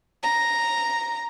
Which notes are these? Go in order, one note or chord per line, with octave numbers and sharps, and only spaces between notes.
A#5